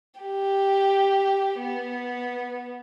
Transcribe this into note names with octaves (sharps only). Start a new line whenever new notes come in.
G4
B3